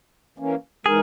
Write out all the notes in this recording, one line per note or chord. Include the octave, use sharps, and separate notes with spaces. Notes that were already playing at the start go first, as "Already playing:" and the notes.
E3 A#3 C#4
E3 G#3 D#4 G#4 A#4